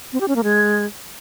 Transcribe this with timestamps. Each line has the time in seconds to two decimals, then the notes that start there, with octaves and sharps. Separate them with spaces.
0.13 C4
0.20 G4
0.28 C#4
0.36 A#3
0.44 G#3